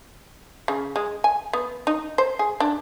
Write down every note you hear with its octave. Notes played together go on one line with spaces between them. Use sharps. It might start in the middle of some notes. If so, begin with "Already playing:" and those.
C#3
G#3
G#5
B3
D#4
C5
G#4
D4